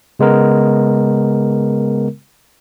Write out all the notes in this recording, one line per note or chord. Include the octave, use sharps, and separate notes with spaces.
C#3 G#3 B3 A#4